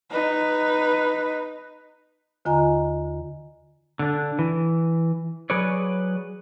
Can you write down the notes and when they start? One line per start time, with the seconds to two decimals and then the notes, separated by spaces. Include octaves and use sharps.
0.11 D#4 B4
2.45 D#2 D3 F4 D#5 G#5 A#5
3.99 D3 D4
4.39 E3
5.50 F#3 G#4 B4 C#5 D5